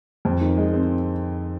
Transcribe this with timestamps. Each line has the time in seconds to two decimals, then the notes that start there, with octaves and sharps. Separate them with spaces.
0.25 F2
0.41 D#3
0.57 G#3
0.73 C4